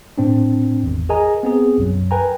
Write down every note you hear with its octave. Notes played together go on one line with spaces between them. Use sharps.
A2 C4 D4
G#1 E2
G#4 A#4 D#5 G#5 A#5
B3 C4 G#4
B1 F#2 F#3
A#4 B4 G5 G#5 A#5